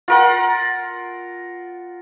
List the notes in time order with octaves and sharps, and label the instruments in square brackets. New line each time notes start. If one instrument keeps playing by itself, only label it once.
[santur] F4 A#4 F#5